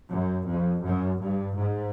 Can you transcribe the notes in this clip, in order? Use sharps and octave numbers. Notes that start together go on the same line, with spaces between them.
F#2
F2
F#2
G2
G#2